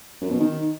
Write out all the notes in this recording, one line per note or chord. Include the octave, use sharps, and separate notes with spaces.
F#2
B2
D#3